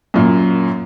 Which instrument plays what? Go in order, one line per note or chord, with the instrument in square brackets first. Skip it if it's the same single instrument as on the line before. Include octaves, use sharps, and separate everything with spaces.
[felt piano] F#2 A#2